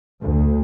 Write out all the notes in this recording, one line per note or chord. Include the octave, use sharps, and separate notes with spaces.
D2